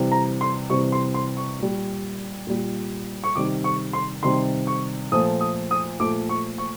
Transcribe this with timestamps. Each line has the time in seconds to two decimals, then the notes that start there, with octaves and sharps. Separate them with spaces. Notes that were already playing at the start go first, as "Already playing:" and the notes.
Already playing: C3 E3 G3
0.12 A#5
0.41 C6
0.70 C3 E3 G3 C#6
0.92 C6
1.14 C6
1.37 C#6
1.59 A#2 G3
2.47 A#2 G3
3.24 C#6
3.35 C3 D#3 G3 D6
3.64 C#6
3.93 C6
4.23 C3 D#3 G3 C6
4.67 C#6
5.12 A#2 F3 A3 D#6
5.41 D#6
5.71 D#6
6.00 A#2 F3 A3 D6
6.29 C#6
6.58 C#6